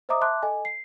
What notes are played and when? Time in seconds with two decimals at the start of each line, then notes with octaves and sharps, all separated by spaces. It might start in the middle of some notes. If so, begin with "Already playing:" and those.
0.09 C5 D#5 E5 A#5 D6 D#6
0.21 E5 A5 C6 D6 F#6
0.42 A4 D#5 G#5
0.65 C7